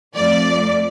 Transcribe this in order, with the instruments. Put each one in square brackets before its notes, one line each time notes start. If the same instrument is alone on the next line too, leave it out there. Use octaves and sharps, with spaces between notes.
[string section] F2 F3 A3 D5